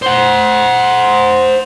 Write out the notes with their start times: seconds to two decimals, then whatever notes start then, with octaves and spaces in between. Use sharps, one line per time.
0.02 C5 F#5